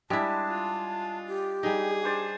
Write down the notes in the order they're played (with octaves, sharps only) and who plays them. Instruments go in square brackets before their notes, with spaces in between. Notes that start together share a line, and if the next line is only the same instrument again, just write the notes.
[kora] G3 E4 [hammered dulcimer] G#3 D4 [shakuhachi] A5
[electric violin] F4
[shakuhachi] G4
[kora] G3 D#4 [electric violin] G#4
[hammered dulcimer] D4 C5 D5